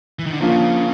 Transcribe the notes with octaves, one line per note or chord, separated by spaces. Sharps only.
E3
D#3
D3
C#3 F3 A#3 D4 F4